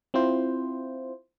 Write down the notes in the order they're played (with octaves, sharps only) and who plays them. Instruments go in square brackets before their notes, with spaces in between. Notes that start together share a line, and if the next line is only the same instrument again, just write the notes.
[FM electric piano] C4 E4 F4 C5